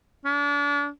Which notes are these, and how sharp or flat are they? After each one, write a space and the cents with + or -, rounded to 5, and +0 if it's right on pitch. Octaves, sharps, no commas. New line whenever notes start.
D4 -35